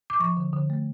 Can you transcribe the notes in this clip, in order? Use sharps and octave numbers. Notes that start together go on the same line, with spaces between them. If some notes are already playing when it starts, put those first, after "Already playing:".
D6
F3 C#6
D3
D3
A3